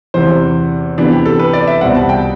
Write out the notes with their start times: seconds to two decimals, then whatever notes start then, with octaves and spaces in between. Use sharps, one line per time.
0.14 E2 C3 E3 C5
0.98 C3 E3 B3 D4
1.12 G4
1.26 A4
1.39 B4
1.53 D5
1.67 E5
1.81 C2 B2 G3 C4 F#5
1.95 A5
2.09 G5